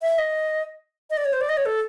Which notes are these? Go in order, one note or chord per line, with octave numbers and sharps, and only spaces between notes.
E5
D#5
D#5
D5
C#5
C5
D5
D#5
C#5
A4